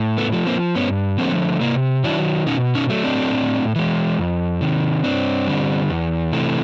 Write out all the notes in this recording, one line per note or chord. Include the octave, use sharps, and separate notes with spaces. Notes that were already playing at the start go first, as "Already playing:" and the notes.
Already playing: A2
A3 B3
F3 A3
A#3 C4
G2 B3 C#4
D3 F3 A3 A#3 C4
C3 A#3
D#3 F#3 D4 E4
B2 C#4 D#4
C#4 D#4
F#3 A3
C4 D4
A2
E3 G#3
F2
C3 D#3
G2 C4 D4
D3 G3
E2
C3 E3 A3